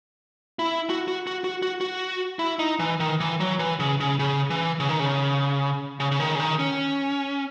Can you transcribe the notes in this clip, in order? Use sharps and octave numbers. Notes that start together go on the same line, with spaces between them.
E4
F#4
F#4
F#4
F#4
F#4
F#4
E4
D#4
E3
D#3
E3
F#3
E3
C#3
C#3
C#3
E3
C#3
D#3
C#3
C#3
C#3
D#3
C#3
D#3
C#4